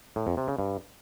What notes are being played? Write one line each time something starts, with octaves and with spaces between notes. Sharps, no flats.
A2
F2
C3
C#3
G2